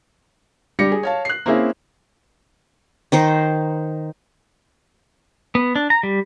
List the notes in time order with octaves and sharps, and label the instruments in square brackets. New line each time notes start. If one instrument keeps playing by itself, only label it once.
[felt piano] G3 D4 G4 A#6 C#7
G#4
C#5 F5 A5
F#6 C7
A#3 C4 C#4 E4 G#4
[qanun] D#3 D#4 C5
[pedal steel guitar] B3
D4
A#5
G3